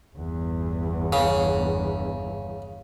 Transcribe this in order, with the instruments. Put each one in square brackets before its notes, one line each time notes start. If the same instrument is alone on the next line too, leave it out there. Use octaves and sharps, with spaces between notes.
[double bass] G1 E2
[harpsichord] C#3